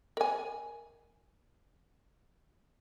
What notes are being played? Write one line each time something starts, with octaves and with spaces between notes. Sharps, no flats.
A#4 G#5